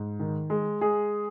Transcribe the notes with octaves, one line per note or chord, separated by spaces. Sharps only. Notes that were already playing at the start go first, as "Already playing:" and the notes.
Already playing: G#2
D#3
G#3
G#3 G#4